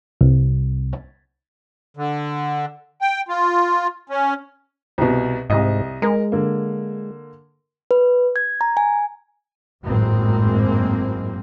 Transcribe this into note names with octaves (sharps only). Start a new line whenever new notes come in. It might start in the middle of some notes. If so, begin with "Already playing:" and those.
C2
D3
G5
F4
C#4
C2 B2
C2 G#2 D#5
G#3 A#4
D3 A#3
B4
G#6
A#5
G#5
G#1 F#2 A2 G#3 A#3 C4